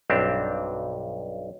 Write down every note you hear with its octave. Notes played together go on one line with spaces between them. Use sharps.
B1 G2 C4 D4 G4 A5